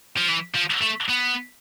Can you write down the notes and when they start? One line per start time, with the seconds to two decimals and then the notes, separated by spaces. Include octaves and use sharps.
0.17 F3
0.29 E3
0.55 F3
0.82 A3
1.10 B3